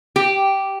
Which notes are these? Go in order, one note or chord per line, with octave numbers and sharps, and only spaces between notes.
G4